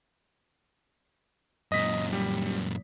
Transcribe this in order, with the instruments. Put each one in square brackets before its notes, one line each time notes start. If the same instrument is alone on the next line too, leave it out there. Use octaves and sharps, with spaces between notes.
[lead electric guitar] F#2 A#2 [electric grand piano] D#5 B6
[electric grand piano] G3